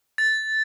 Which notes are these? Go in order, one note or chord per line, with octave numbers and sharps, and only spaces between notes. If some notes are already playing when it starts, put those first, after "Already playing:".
A6